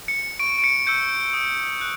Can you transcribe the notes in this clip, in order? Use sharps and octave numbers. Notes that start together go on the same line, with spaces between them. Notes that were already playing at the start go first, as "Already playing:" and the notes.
C#7
C#6 D7
D7
C#7
E6 G6 C#7
D#6
F#6